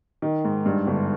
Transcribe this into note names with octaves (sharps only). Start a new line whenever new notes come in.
D#3
G#2
G2
G1